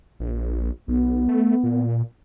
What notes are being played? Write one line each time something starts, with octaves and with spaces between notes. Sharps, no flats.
A#1
B1 B3
A3
A#2